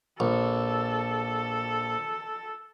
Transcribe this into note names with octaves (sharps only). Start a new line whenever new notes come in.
A#1 A4